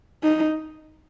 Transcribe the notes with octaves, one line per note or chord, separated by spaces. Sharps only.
D#4